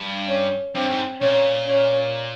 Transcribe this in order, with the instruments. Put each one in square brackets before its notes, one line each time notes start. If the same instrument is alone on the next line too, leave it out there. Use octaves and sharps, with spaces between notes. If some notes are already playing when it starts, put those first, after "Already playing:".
Already playing: [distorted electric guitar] G2
[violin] C#4
[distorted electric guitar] G2 [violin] C4
[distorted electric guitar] G#2
[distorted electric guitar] A#2 [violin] C#4
[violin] C#4